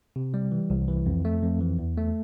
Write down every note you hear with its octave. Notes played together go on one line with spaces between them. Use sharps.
C3
G3
E3
C2
E3
F2
A3
F2
E3
E2
A3